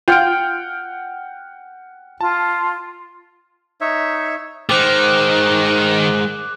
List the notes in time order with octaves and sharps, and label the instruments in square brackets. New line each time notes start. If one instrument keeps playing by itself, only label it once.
[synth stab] F4 [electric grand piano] F#5 F6 D7 [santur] G5
[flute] F4 [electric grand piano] A5
[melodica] D#4 C#5 E5
[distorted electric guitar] D#3 [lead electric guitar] G#3 C5 [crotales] D6 F#6